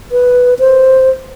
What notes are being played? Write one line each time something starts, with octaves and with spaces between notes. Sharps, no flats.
B4
C5